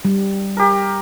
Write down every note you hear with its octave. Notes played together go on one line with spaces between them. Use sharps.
G3
G4 A#4